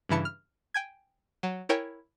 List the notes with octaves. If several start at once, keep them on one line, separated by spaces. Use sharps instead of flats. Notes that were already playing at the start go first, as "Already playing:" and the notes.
G2 C#3 E3 E4 A5 C#7
F6
G5 G#5 G#6
F#3
E4 A#4 C#5 G5 G#5